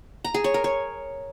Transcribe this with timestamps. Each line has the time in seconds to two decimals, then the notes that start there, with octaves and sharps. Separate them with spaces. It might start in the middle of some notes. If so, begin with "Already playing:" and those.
0.24 A#5
0.34 G#4
0.44 C#5
0.54 A#4
0.64 C#5